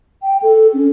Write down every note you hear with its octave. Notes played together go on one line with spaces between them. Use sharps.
G5
A4
C#4